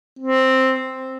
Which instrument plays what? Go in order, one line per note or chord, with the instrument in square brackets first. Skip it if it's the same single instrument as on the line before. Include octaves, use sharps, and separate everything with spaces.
[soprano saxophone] C4